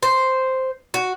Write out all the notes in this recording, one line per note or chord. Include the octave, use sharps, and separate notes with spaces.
C5
F#4